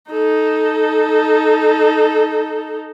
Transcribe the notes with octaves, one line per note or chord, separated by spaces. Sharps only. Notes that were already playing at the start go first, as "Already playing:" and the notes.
D#4 A4